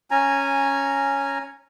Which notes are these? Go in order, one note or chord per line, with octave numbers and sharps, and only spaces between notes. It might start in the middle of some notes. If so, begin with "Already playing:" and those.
C#4 G#5 A#5